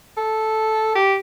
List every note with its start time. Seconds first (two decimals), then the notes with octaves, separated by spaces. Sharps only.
0.17 A4
0.95 G4